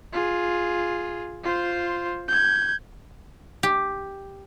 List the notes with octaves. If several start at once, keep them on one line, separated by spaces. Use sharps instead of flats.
F4 G#4
F4 C5
G6 G#6
G4